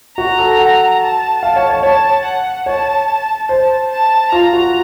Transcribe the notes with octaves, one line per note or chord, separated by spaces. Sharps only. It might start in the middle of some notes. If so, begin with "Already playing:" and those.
F#4 A#5
A4
F#5
A5
F5
C#5
C#5
C#5 A5
F#5
C#5 A5
C5 A5
A5
F4 A#5
F#4